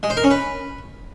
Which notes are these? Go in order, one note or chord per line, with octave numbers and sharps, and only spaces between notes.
G#3
C5
A#4
C#4
B4